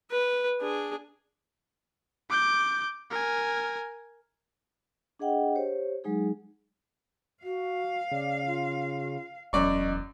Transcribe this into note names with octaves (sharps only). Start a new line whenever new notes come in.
B4
D4 G#4
D6 G6
A#4 G#5
D4 G#4 D#5 F#5 G5
G4 C5 C#5
F#3 G#3 D#4 G#4
F#4 F5
C#3 D5
F4
E1 F#2 D5 D#5 C#6